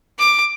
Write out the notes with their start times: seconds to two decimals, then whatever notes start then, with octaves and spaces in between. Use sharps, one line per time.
0.19 D6